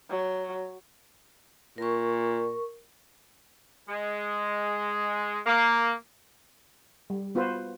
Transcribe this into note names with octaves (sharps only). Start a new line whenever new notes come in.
F#3
A#2 A#4 C#6
G#3
A#3
G3
B3 F4 F#4 B4 C5